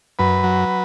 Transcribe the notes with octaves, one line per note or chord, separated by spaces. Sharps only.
F#2 B4
F#3